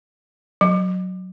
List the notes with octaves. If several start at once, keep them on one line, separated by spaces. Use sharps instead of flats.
F#3